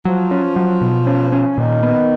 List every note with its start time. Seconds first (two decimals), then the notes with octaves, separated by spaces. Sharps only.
0.05 F3 F#3
0.31 C#4
0.56 F#3
0.81 B2
1.07 C#4
1.32 C#4
1.58 A#2 D#3
1.83 B3